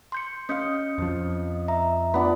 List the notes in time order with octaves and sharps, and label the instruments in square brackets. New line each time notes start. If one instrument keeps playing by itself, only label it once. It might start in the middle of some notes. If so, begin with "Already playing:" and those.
[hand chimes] C6 G6 C#7
[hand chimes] C#4 G6 C#7 [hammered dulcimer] D#5 F5
[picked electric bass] F2 F3
[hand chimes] E5 A#5
[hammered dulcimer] B3 D4 [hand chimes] F4 B5